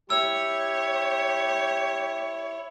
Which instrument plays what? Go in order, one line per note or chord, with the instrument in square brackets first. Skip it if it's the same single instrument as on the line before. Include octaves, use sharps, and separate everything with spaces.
[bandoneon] E4 [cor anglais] G4 [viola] C#5 [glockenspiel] E6